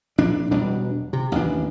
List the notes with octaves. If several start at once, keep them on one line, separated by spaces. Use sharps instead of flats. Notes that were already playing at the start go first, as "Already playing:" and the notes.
A#1 D4
E1 B2 G3 D4
C3
A1 D#2 E3 D4